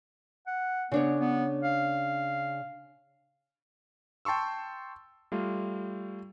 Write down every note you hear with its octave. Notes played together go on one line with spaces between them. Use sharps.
F#5
C#3 B3 D4 C#5
B3
F5
G5 A5 C6 C#6 E6
G3 A3 F4